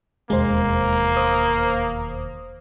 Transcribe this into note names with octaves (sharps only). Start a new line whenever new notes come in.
E1 D#2 G#3 A#3 C5
C5 D#6